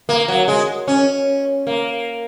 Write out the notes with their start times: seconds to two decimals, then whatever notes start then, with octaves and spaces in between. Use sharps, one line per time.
0.09 A#3
0.28 F#3
0.48 G#3
0.88 C#4
1.67 A#3